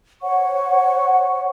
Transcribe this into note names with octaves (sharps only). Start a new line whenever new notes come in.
C5 C#5 F#5 C#6